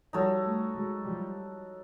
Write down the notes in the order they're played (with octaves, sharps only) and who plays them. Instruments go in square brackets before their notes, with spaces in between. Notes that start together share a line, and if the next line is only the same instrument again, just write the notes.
[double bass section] F3 G3 [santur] D#4 F#4 A4 C#5
[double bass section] G3 A3
F#3 G#3
F3 G3